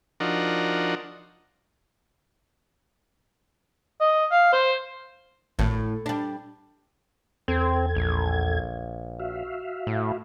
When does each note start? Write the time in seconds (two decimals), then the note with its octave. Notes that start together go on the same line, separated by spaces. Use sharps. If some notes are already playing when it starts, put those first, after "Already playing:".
0.20 F3 D4 D#4 F#4 A#4
4.00 D#5
4.31 F5
4.53 C5
5.59 G#1 A2
6.06 G3 D4
7.48 E2 C4 A4 G#6
7.95 A#1
9.20 F#4 E5 F5
9.87 A2